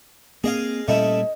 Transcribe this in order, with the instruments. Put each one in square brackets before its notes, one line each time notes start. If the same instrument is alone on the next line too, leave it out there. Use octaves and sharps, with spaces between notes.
[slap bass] A#3 C4 [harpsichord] G#4 D#5 F5
[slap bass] A#2 G3 [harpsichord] A3 C#4 E4 [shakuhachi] D#5